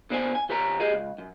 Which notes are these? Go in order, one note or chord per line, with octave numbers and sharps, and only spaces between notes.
D3 B3 C5 D5 F5 G#5
G#5
D3 G4 B4 C#5 F#5 A#5
G4 G#4 D#5
C#2
F#2